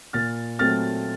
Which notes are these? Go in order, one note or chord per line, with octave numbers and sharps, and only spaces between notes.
A#2 F6 A6
F#3 A3 C4 F6 A6